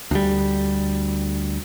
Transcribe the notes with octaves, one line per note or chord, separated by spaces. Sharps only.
D2 G3